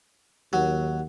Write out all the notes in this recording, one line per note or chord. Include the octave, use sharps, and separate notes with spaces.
D#2 F#3